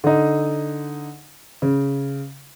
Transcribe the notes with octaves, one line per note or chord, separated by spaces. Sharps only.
D3 D#4
C#3